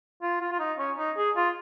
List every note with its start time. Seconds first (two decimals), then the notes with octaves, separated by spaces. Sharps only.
0.22 F4
0.41 F4
0.52 F4
0.59 D#4
0.78 C#4
0.97 D#4
1.17 G#4
1.36 F4